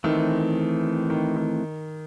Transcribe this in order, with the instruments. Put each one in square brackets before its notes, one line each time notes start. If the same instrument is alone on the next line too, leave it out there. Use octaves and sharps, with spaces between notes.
[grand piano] D#3 [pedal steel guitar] E3 A3 C4
[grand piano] D#3
D#3